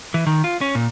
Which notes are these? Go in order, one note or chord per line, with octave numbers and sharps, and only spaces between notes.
E3
D#3
F4
C#4
A#2